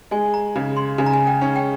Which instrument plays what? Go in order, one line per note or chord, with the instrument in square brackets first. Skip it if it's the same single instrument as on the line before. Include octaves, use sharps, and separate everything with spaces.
[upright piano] G#3 [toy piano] G#5
[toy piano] A#5
[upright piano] C#3
[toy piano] C6
[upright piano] C#3 [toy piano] G#5
[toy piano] A#5
G#5
G5
[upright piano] C#4
[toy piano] G5